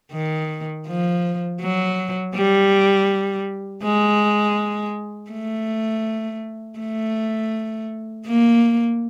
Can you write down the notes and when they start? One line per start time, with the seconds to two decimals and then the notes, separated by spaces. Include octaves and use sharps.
0.12 D#3
0.87 F3
1.61 F#3
2.35 G3
3.83 G#3
5.31 A3
6.79 A3
8.27 A#3